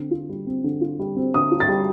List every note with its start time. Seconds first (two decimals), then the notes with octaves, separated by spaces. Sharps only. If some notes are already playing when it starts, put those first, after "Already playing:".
Already playing: D3 C4
0.11 F4
0.29 G3
0.47 C4
0.64 D3
0.81 F4
0.99 G3
1.16 C4
1.34 D3 D#6
1.51 F4
1.60 A6
1.69 G3